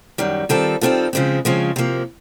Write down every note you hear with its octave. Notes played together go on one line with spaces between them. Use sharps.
F#2 D#3 G3
D#3 G3 C4 F4 A4
D#3 G3 C4 F4 A4
C#3 F3 G#3 C4
C#3 F3 G#3 C4
C3 F3 A#3